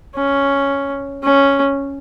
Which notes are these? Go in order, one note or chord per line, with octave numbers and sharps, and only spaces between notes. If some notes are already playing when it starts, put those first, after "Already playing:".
C#4
C#4